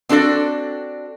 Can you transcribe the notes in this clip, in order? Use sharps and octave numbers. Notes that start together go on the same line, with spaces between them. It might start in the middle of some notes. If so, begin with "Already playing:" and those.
C4 D4 F#4 A4 D5